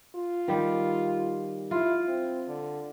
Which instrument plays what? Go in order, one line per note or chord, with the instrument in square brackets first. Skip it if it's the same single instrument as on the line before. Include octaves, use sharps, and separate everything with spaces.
[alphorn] F4
[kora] D#3 G3
[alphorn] E4 [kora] F4
[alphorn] C4
D3